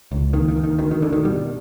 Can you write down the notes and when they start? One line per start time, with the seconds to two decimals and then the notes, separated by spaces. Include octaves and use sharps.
0.12 C#2
0.33 D#2 D#3
0.48 D#3
0.57 D#2
0.64 D#3
0.79 D2 D#3
0.91 D#3
1.02 D2 D3
1.13 D#3
1.25 B2 G3